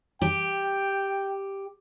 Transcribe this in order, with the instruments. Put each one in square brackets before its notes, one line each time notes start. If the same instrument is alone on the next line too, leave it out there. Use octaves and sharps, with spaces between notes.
[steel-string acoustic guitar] G4 [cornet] G5